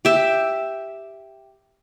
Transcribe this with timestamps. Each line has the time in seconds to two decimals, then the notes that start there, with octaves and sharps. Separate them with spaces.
0.05 G4 E5